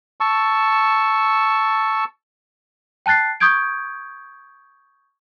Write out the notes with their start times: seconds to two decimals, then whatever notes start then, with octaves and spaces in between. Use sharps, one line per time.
0.20 A5 C#6 E6
3.06 G5 A5 F#6 A6 C7
3.40 C#6 D#6 G6 G#6 D7